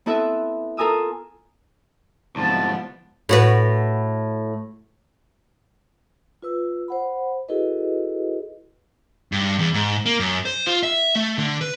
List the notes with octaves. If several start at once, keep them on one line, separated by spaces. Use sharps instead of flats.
B3 C4 E4 A4 B4 E5
F4 A4 A#4 G#5 D#6 E6
C2 G#2 D3 F3 B3 A5
A2 F#4 B4
F4 B4 E6
C5 F#5 B5
E4 F#4 G#4 A4 B4 D#5
G2
E2
G#2
A#3
F#2
C5
F4
E5
A3
D3
B4